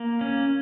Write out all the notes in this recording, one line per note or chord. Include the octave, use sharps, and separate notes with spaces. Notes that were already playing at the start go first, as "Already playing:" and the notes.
Already playing: A#3
C#4